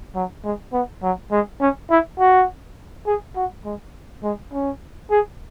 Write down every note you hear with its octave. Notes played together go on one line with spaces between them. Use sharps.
F#3
G#3
B3
F#3
G#3
C#4
E4
F#4
G#4
F#4
G#3
G#3
C#4
G#4